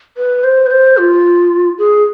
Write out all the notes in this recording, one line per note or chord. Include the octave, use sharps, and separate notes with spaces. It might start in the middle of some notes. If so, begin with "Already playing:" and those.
B4
C5
B4
C5
F4
G#4